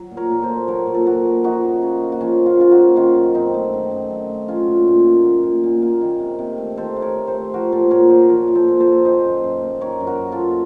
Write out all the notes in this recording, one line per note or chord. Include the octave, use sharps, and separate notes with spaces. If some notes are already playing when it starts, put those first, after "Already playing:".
Already playing: F#3
A#2
A#4 C#5
A#2 A#4
A4 C5
A#3
F#3 A#4 C#5
A#2
A4
A#2 F#4 A#4
A#3
F3 D#4 F#4
C#3
C#3
A#3
F#4
F3 C#4 F4
C#3
C#4 F4
C#3 F4
D#4 F#4
A#3
D#3 C#4 F4
F#2
F#2 C4 D#4
A3
D#3
F#2
F#2
A3
F#3 C#4 F4
A#2
A#2
A#3
F#3
A#2
A#2
A#3
D#3
C3
C3
A3
D#3 A4 C5
C3
A#4 C#5
C3
A4 C5
A3
F3 F#4 A#4
A#2 A4 C5
A#2 A#4 C#5
A#3 C5 D#5
F3 A#4 C#5
A#2
A4 C5
A#2
A4 C5
A#3
D#3 C5 D#5
F#2
F#2
A#3
D#3 A#4 C#5
F#2
F#4 A#4
F#2
F4 A4
A#3